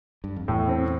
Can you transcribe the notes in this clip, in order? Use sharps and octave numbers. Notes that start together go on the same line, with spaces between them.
G2
F2
E2 A2
C4